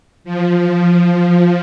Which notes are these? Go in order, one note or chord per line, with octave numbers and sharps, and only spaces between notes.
F3
F3